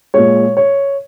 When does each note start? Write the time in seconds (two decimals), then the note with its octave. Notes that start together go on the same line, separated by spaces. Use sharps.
0.14 A#2 G#3 C#5
0.57 C#5